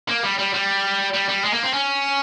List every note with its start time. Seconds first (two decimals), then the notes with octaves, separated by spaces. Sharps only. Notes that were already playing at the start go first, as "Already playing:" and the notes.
0.08 A#3
0.24 G3
0.38 G3
0.54 G3
1.14 G3
1.29 G3
1.44 G#3
1.53 A#3
1.63 C4
1.74 C#4